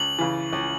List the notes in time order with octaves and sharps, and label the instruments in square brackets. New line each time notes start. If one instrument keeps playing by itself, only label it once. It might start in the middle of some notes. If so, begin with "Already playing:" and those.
Already playing: [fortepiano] C#2 [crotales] F#7
[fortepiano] C#3 E3
C#2